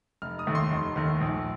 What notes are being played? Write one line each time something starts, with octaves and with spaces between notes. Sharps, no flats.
F1 F6
D#6
D#2 D#3 A3
C6
F1
D#2 D#3 A3
A#1